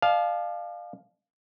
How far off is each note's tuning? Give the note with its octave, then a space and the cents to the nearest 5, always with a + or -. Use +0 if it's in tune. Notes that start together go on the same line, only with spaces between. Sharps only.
D5 +40 F5 +0 A5 -35